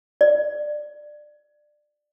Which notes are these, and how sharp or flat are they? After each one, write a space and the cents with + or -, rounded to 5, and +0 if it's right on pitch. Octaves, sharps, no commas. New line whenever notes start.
D5 +15